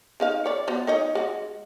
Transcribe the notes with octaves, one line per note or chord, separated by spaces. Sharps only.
C#3 D#4 F5
C#5 D5
F#3 B3 C5
D#4 C#5 D#5
G#3 F#4